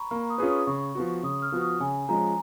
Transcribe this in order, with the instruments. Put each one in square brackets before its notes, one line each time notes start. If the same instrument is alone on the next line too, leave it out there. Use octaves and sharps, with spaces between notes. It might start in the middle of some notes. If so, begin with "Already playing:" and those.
Already playing: [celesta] A#5 B5 C#6
[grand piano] A#3 [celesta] C#6
[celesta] D#6
[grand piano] C#4 F4 G#4 B4
[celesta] D#6
[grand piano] C#3 [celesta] C#6
[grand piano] F3 B3 F#4
[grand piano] C#3 [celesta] D#6
[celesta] F6
[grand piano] F3 B3 F#4
[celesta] D#6
[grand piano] C#3 [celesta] G#5
[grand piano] F3 G#3 C#4 [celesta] A#5